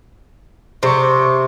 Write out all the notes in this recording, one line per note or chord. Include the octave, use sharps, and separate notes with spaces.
C3 C5 C#6